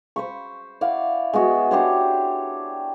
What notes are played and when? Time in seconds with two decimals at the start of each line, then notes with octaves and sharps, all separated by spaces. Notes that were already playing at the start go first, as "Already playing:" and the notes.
0.16 C5 B5 C#6
0.81 E4 D5 F5 F#5
1.33 G#3 B3 F#4
1.71 D4 G4 C5 C#5